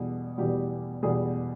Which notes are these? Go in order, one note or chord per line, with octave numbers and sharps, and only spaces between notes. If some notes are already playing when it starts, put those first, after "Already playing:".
Already playing: E2 B2 G3 G#4
E2 B2 G3 G4
E2 B2 G3 G#4